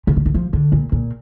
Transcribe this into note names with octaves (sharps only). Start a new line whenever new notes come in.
C3
D3
D#3
F3
D3
A#2
A#2